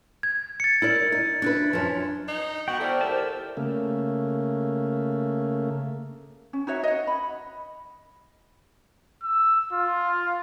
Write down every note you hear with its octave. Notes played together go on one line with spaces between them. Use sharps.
G#6
A6 C#7
E4 A#4 D5
D#4
D4 E4 B4
F#2 F3
D#4
B3 F#4 G5
E4 A4 C5 D5 F6
G4 A#4 A5
C#3 A3 A#3
C#4
D#4 F#4 C#5 E5
D#5 F#5
B5
E6
F4